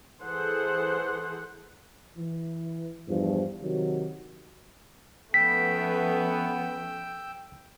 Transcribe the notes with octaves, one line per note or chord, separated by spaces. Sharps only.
E3 G#4 A4 C5 F#5
E3
E2 G2 F3
C3 D#3 F#3
F3 A3 B3 C#4 G5 E6 B6